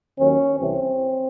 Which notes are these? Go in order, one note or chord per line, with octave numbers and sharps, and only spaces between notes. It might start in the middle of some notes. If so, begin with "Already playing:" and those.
D#2 D#3 F#3 C#4
C2 C3 E3 C4